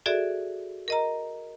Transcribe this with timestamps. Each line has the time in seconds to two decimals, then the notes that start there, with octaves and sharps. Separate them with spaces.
0.06 F#4 G#4 A4 D5 E5
0.88 A#4 D#5 A#5